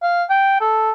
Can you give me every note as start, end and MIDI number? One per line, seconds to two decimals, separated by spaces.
0.03 0.24 77
0.30 0.58 79
0.61 0.91 69